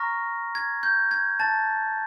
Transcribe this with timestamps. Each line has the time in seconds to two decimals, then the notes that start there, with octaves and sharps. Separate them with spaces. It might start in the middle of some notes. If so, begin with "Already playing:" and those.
Already playing: A#5 C#6 F6 A#6
0.55 G#6
0.83 G6
1.11 G#6
1.40 A5 A6